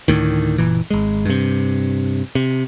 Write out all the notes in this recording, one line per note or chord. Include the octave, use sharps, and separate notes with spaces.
D2 A2 D#3
F#1 A#2 E3
G#1 G#3
G2 C3
C3